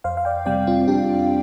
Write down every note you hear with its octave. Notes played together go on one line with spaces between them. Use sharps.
F2 C5 F5
F5
D5 G5
C3 G3 C4 D5 G5
C4 F4
F2 D4 G4